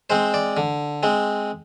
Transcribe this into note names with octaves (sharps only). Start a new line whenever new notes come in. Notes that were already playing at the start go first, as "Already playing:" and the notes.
G#3 C4 C5
D5
D3
G#3 C4